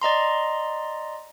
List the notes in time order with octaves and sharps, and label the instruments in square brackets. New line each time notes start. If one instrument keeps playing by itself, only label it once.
[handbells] D5 D#5 A#5 C6